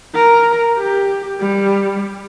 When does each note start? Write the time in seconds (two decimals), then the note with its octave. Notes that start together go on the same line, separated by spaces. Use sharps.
0.15 A#4
0.77 G4
1.41 G3